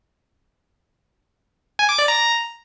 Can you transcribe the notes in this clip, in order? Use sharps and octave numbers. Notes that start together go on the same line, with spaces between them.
G#5
D6
D5
A#5